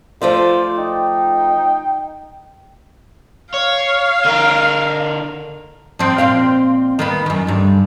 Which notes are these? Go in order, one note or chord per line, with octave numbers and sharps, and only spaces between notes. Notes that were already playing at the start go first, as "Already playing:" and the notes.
F3 A3 F4 C5 D5
D#4 G5
C#5 F5
D3 A#4
F3 C4
A#2 C4 F5
D#3 A#3 B3
F#2 D#3
D2 G2